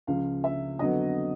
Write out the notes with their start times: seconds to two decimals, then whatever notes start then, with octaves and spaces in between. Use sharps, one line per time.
0.07 C#2 C#3 F3 F5
0.44 E5
0.79 F2 D3 F#3 B3 D#5